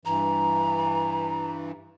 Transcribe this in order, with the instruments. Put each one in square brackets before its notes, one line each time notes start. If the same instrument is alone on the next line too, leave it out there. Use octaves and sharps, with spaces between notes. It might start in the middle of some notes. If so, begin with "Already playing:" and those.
[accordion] G2 E3 [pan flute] A#5